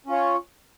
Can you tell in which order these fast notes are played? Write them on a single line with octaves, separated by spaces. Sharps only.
C#4 F4 C#5